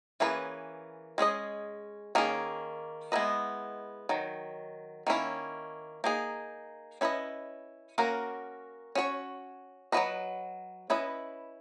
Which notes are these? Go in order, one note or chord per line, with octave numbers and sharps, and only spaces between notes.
E3 A#3 C#4 G#4 B4
G#3 C#4 G#4 D#5
D#3 A#3 C#4 G#4
G#3 B3 E4 B4 D#5
D#3 F#3
D#3 A#3 C#4 E4
A#3 D#4 G#4
C#4 E4 B4 D#5
A#3 C#4 F#4 A#4
C#4 F#4 C#5
F#3 C#4 F#4 B4 D#5
C#4 E4 B4 D#5